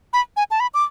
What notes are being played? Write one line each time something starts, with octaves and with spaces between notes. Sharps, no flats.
B5
G#5
A5
B5
D6